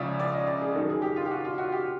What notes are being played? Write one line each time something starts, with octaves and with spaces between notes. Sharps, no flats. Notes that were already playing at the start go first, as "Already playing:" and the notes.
Already playing: C#2 C#3 F3 D5 E5
D5
D#5
D5
G#4
F#2 D#3 A4
G#4
G4
F4
G4
F#4
F4
F#4
G4